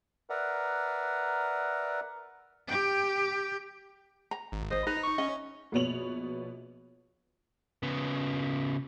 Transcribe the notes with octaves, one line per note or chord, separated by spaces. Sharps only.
A#4 B4 D5 E5 F#5 A#5
G4 G5
A#5
G#1
C5 D#5
D#4 B4 A#5
C#6
C#4 D#5
A#1 B2 B3 C#5 F7 F#7
C#3 B3